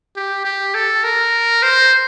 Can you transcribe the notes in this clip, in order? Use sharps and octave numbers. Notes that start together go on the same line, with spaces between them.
G4
G4
A4
A#4
C5